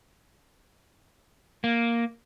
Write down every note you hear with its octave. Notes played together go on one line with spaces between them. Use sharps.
A#3